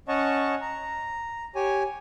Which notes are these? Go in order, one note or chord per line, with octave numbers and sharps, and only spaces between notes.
C#4 C#5 D#5 F#5 A5 C#6
A#5
G4 C#5 G#5